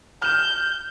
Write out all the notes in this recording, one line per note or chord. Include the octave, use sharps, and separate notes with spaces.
F6 G6 E7